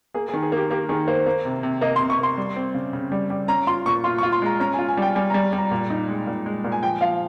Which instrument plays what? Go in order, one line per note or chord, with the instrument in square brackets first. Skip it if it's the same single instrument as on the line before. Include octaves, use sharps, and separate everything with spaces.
[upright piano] A#3 [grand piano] G#4
[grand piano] G#4
[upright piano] D#3
[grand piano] G#4
[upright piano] A#3 [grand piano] G4
[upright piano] A#3 [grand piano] G4
[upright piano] D#3 [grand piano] G#4
[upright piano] A#3 [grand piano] C5
[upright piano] A#3
C3
C3
[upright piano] A#3 [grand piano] D#5
[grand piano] C6
[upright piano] C3
[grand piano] C#6
[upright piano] A#3 [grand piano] C6
[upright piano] G3
C4
C#3
C#3
G3
G3
[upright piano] C#4 [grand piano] A#5
[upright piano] F4 [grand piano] C6
[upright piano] A#2 [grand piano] C#6
[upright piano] F4 [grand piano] C6
[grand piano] C#6
[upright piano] F4
[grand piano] C6
[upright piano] G#3 [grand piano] A#5
[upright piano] C#4 [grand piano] A#5
[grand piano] G#5
[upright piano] F4
[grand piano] G#5
[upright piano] G3 [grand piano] G5
[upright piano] G3 [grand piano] G#5
[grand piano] A#5
[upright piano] G3
G3
[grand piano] A#5
[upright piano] A#2
D#4
G#3
A#2
G#3
A#2
[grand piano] G#5
[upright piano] F3 [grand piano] G5
[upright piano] F3 [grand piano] F5